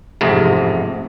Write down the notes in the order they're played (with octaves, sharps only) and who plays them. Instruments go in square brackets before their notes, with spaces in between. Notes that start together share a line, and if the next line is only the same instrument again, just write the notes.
[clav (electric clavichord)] A1 F2 G#2 C3